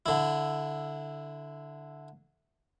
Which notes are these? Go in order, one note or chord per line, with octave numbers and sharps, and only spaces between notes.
D3 E4